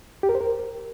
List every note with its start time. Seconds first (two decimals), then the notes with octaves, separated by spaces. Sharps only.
0.23 G4
0.29 A#4
0.35 C5
0.41 A#4